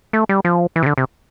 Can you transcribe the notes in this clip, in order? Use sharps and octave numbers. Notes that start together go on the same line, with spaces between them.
A3
G3
F3
E3
C3
D3
C3